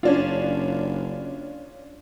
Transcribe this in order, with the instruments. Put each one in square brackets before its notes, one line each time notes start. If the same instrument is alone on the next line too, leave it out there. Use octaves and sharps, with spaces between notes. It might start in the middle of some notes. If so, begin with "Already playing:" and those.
[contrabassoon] F#1 [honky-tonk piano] C#4 D4 F4